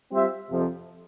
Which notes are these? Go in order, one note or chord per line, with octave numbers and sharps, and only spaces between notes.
G3 C4 F4 C5 E5
F2 C3 F3